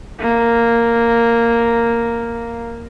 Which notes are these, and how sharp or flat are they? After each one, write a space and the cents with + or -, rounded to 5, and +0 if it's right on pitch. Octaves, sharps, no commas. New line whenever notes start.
A#3 -5